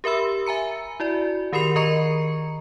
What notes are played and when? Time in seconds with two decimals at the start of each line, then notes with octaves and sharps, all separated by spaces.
0.04 G4 A#4 E5 B5 E6
0.46 E5 G#5 A#5 C#7
1.00 E4 F#4 D5
1.53 D#3 G4 A#4 B5 C7 F7
1.76 D#3 A#4 D#5 A#5 C#6 C#7